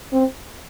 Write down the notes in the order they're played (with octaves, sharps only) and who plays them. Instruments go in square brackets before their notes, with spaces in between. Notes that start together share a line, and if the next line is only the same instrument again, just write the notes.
[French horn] C4